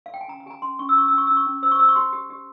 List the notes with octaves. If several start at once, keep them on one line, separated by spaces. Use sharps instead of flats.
F5
G5
G#5
C#4 A#5
A#5
G4 G#5 A#5
C#4 C6
C#4 C#6
E6
C#4 C#6
E6
C#4
C#6
C#4 E6
C#6
C#4
C5 E6
C#6
C5 E6
C#6
G4 C6
G4
G4